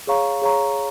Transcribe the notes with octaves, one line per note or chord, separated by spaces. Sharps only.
G#4 C#5 F5 A#5 C#6
G#4 C#5 F5 A#5 C#6